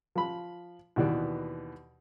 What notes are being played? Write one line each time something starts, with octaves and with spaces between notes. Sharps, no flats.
F3 B5
D#2 B2 E3 D5